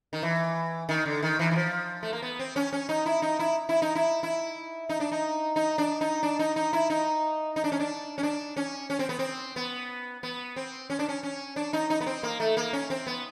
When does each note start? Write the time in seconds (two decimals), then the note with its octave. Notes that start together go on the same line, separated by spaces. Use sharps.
0.13 D#3
0.23 E3
0.89 D#3
1.06 D3
1.23 D#3
1.39 E3
1.51 E3
1.56 F3
2.03 A3
2.13 A#3
2.22 B3
2.39 C4
2.56 C#4
2.73 C#4
2.89 D#4
3.06 E4
3.22 D#4
3.39 E4
3.69 E4
3.82 D#4
3.95 E4
4.23 E4
4.89 D#4
5.00 D4
5.12 D#4
5.56 D#4
5.78 D4
6.01 D#4
6.23 D4
6.39 D#4
6.56 D#4
6.73 E4
6.90 D#4
7.56 D#4
7.64 D4
7.72 C#4
7.80 D4
8.18 C#4
8.23 D4
8.56 C#4
8.90 C#4
8.99 C4
9.09 B3
9.19 C4
9.56 B3
10.23 B3
10.56 C4
10.90 C#4
10.99 D4
11.08 C#4
11.23 C#4
11.56 D4
11.73 D#4
11.90 D#4
12.00 B3
12.06 C4
12.23 A#3
12.40 A3
12.57 A#3
12.73 C#4
12.90 C4
13.07 B3